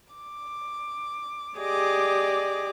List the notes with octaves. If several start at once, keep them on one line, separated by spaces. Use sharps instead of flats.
D6
G4 G#4 D5 D#5 D6